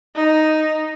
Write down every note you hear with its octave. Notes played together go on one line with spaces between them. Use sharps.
D#4